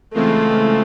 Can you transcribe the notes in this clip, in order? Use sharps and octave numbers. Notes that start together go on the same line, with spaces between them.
C#3 E3 G#3 A3 C4 F4